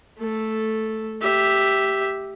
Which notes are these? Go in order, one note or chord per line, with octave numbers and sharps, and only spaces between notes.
A3 A4
G4 E5